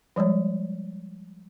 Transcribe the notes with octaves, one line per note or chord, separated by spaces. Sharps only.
F3 G3 G#3 C#5